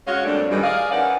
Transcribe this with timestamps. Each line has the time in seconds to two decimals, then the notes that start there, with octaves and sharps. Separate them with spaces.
0.07 G#3 C#4 F#4 C#5 F5
0.25 F2 A#2 G3 A3 D4
0.50 F#2 A2 D#3 E3 G3
0.63 G#4 D5 D#5 F5
0.91 E3 C#4 D#4 A#4 D5 F#5